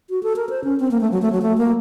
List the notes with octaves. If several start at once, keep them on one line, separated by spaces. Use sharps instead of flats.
F#4
A4
A#4
C5
C#4
C4
A#3
A3
F#3
A3
F#3
A3
A#3